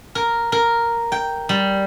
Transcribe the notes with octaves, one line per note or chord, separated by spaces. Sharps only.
A#4
A#4
G5
G3